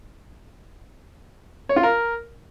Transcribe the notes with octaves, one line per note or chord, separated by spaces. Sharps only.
C#5
F4
A#4